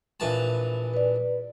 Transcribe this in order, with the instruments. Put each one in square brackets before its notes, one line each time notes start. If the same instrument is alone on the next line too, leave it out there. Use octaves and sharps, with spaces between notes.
[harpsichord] A#1 E3 A5
[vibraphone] B4 D5